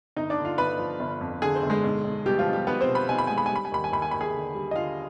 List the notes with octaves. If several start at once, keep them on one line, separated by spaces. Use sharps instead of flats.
G1 D#4 D#5
D4 D5
D3
F4 F5
G1 B4 B5
F3
G1
F2
D3 G#4 G#5
C4 C5
G1
G#3 G#4
B1
B1
B2 G3 G4
F3 F4
B1
G3 G4
B1 B3 B4
C4 C5
B2
B4 B5
B1 G#5
B5
G#3 G#5
B5
G#5
G3 B5
G#5
D#2 B5
G#5
D#2 B5
G#5
D#2 B5
G#4 G#5
D3
G3
D#5
D3 F4 F5